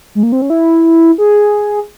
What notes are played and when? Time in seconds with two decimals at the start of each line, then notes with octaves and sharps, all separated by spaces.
0.15 G#3
0.23 A#3
0.32 C4
0.42 C#4
0.50 E4
1.18 G#4